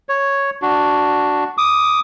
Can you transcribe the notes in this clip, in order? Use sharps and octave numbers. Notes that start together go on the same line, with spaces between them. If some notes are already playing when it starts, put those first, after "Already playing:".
C#5
D4 F#4
D6 D#6